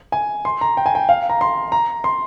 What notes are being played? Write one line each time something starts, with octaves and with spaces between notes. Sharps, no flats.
G#5
C6
A#5
G5
G#5
G5
F5
A#5
C6
A#5
C6